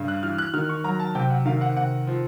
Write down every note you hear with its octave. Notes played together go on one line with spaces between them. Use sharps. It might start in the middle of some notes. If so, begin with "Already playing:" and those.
Already playing: G2 C#3
F#6
E3 F6
F#6
D#3 F6
C#6
F#3 A#5
A5
C3 G5
F#5
D#3 F5
F#5
C3 F#5
F3